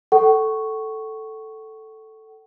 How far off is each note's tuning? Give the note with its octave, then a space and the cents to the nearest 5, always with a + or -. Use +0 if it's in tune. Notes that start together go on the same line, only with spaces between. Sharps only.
A4 +0 F#5 +40 C#6 +0